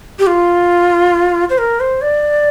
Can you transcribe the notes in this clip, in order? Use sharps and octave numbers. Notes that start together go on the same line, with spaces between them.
G4
F4
C5
A#4
C5
D5